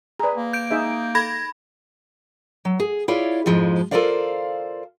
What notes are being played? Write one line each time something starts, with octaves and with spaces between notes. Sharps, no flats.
G#4 B4 D5 A#5
A#3
G6 D7
D#4 G#4 E5
A4 B5 G#6 A#6
F#3
G#4
E4 F4 C#5 D5
F2 G#2 F3 G#3
F4 A4 A#4 C5 D5 F5